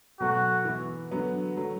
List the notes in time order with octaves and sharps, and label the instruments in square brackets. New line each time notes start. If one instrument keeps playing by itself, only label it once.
[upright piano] B2 F#3 A3 [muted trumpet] F#4
[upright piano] E3 B3 E4
D3 F#3 B3
D3 F#3 A3